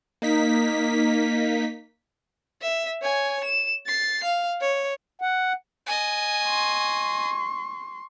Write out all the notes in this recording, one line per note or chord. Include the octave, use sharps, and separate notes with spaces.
A#3 D#4 B6
E5
C#5 G#5
E7
A6 C7
F5
C#5
F#5
D#5 G#5
C6 C#6